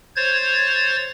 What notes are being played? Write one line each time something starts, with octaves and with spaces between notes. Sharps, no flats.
C5 C#5 G#6 A6